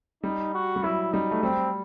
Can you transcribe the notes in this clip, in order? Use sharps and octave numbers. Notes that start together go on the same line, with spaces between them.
G3 D#4
F#4
G3
F#3 E4
G3 D#4
A3
G3 C4